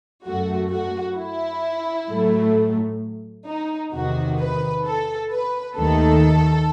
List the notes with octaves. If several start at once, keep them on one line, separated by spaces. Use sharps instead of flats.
F#2 F#3 A3 F#4
F#4
E4
A2 F#3 A3
D#4
E2 C3 D#3 F#4
B4
A4
B4
D#2 D#3 A3 A4